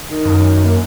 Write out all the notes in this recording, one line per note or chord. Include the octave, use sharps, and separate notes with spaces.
D#3
F#2
A#3